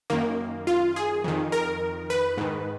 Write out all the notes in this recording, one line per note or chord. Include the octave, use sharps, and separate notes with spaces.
F#2 D#3 A#3
F4
G#4
F2 D#3
A#4
B4
G#2 D#3